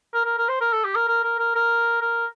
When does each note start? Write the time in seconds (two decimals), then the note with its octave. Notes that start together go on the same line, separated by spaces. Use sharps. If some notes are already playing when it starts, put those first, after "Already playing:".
0.14 A#4
0.25 A#4
0.38 A#4
0.49 C5
0.61 A#4
0.73 A4
0.84 G4
0.96 A#4
1.08 A#4
1.24 A#4
1.39 A#4
1.55 A#4
2.01 A#4